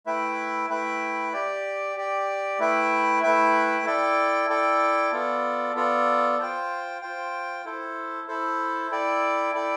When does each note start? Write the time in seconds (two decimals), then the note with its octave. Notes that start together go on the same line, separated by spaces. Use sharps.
0.06 A3 E4 B4 E5 G5
0.70 A3 E4 B4 E5 G5
1.33 G4 D5 G5
1.96 G4 D5 G5
2.59 A3 E4 B4 E5 G5
3.23 A3 E4 B4 E5 G5
3.85 E4 A4 D5 G5
4.49 E4 A4 D5 G5
5.12 B3 F4 A4 D5
5.75 B3 F4 A4 D5
6.39 F4 C5 G5
7.02 F4 C5 G5
7.65 E4 A4 C5
8.28 E4 A4 C5
8.91 E4 A4 D5 G5
9.54 E4 A4 D5 G5